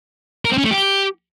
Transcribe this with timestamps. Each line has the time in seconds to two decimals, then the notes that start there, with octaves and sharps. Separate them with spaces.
0.45 A#4
0.51 C4
0.58 C#4
0.64 A3
0.71 G4